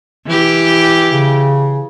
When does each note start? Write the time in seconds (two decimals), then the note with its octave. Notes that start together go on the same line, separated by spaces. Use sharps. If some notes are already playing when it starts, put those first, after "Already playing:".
0.27 E3 G4
1.12 C#3